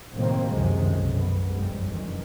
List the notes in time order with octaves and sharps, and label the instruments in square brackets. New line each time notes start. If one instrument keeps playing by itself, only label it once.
[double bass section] A2 C3 D#3 F#3 A#3 C4
C#2 F#2 C3 D#3 F3 G#3
B1 F#2
B3
F1 G2 G3 G#3
F#2 D#3 E3